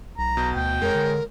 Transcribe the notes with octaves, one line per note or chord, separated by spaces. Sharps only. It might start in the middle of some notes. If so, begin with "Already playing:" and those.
B1 A#5
B2 G6
D2 G5
F2 G#3 A#4 C#5
D3